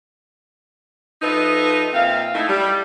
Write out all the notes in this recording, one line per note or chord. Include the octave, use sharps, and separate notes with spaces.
F3 D#4 A4 B4 D#5 E5
A#2 C4 E5 F5
A3 D#4 E4
G3